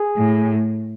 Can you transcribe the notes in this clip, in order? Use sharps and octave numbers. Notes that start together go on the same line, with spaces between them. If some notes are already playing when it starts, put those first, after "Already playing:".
Already playing: G#4
A2